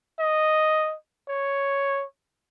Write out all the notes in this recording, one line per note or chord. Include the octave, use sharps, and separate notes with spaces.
D#5
C#5